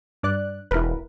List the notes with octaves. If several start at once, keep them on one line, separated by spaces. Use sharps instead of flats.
G2 D5 F#6
E1 E4 A#4 B4